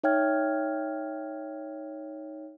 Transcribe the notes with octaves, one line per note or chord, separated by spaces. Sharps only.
D#4 C#5 E5 G5 F6 G#6